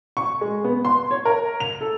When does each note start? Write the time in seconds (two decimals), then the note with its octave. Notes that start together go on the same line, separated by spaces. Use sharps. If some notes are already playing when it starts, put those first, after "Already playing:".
0.17 C#6
0.41 G#3
0.64 B3
0.85 C6
1.11 C#5
1.25 A#4
1.60 F7
1.81 A4